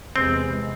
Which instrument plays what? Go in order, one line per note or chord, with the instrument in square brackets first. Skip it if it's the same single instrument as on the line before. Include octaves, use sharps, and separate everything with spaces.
[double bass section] E2 C3 G#3 B3 [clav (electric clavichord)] C4